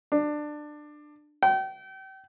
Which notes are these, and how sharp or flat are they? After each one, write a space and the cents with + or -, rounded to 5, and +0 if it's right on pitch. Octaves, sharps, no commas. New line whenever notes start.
D4 +20
G5 -35